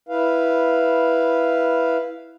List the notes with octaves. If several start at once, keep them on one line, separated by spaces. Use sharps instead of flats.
E4 B4 F5